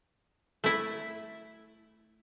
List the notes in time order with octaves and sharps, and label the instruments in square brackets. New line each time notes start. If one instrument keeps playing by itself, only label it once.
[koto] A3 E4